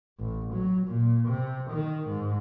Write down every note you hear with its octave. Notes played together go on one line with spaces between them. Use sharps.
A1
F#3
A#2
C3
D#3
G#2